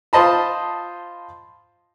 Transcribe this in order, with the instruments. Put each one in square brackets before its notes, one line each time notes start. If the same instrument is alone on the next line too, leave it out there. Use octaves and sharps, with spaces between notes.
[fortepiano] F4 C5 D#5 A5 B5